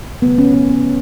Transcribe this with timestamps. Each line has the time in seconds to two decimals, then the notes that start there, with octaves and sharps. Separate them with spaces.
0.21 C#3 F#3 A3 B3
0.38 C#4
0.54 B3
0.70 B3